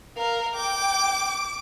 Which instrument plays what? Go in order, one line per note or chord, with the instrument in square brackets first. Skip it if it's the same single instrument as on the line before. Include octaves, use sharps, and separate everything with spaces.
[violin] A#4 [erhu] F5
[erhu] G5 [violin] D6